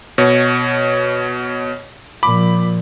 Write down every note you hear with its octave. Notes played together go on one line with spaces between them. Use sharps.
B2 C#5
A#2 F3 B5 D6